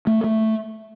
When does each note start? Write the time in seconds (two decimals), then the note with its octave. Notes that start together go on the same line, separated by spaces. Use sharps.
0.07 A3
0.24 A3